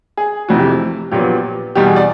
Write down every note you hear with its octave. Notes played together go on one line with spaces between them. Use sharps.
G#4
F1 F2 C3 E3 F#4
G4
A#1 A#2 F#3 B3 G4
E2 B2 G3 G4
G#4
D5